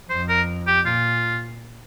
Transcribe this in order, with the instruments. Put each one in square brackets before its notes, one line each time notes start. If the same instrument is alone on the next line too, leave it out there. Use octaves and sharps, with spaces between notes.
[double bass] F2 [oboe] C5
[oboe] A#4
G4
[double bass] A#2 [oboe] F4